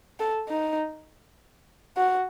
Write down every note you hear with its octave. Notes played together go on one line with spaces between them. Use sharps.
A4
D#4
F#4